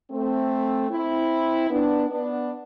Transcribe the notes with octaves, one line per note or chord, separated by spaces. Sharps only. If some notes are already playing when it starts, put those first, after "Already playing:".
A3 C4
C4 E4
B3 D4
B3 D4